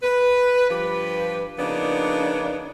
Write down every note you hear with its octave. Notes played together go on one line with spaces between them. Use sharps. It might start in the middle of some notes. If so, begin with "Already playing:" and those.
B4
G2 F3 G4 B4
C#3 F3 A#3 B3 D4 D#4